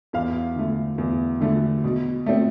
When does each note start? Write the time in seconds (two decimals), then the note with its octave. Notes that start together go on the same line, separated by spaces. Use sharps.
0.13 E2 F5
0.56 D3 A3
0.98 E2
1.40 D3 A3
1.84 B2
2.26 A3 C4